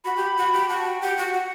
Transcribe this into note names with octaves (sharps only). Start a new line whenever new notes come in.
F#4 B5
G4
F#4
G4
F#4 A5
G5
G4 F#5
F#4
F#4